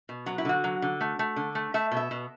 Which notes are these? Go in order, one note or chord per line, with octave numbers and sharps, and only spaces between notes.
B2
F#3 F#4
E4
D3 F#4
F#3
D3
A3
A3
D3
A3
A3 E5
B2
E5
B2